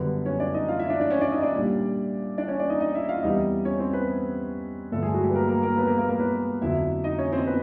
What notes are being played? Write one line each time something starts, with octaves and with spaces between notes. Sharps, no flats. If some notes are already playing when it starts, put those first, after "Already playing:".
Already playing: F#2 D3 G3 B3 B4
C#4 C#5
D4 D5
D#4 D#5
F4 F5
E4 E5
D4 D5
D4 D5
C#4 C#5
D4 D5
D#4 D#5
D4 D5
A#2 G3
D4 D5
C#4 C#5
D4 D5
D#4 D#5
D#4 D#5
E4 E5
F4 F5
E2 C3 E3 G3 D#4 D#5
C#4 C#5
C4 C5
B3 B4
G2 D3 F3 A3 A4
G#3 G#4
F#3 F#4
G3 G4
B4
A#3 A#4
A#3 A#4
A#3 A#4
B3 B4
A#3 A#4
A#3 A#4
A#3 A#4
B3 B4
F2 D3 F#3 E4 E5
D#4 D#5
C#4 C#5
C4 C5
B3 B4